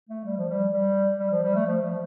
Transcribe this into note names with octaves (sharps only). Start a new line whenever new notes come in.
A3
G3
F3
G3
G3
G3
F3
G3
A3
F3
F3